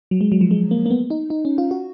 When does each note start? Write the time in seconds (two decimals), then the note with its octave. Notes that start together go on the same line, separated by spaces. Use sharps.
0.11 F#3
0.21 G#3
0.32 F#3
0.41 F3
0.51 G#3
0.71 A#3
0.86 A#3
0.90 B3
1.10 D#4
1.30 D#4
1.45 C#4
1.58 F4
1.71 F#4